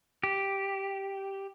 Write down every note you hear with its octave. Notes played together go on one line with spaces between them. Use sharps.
G4